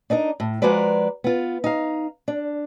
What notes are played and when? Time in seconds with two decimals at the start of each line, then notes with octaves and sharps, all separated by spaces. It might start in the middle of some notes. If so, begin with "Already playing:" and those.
0.10 D4 D#4 A#4 D#5
0.40 A2
0.62 F3 G#3 F#4 A#4 B4 D5
1.24 B3 F4
1.64 D#4 F5
2.28 D4